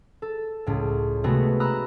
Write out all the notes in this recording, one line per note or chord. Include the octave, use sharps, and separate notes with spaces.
A4
C#2 A2
C3 G#3 A3 B3 F#4
A#5 B5 D#6 E6 F#6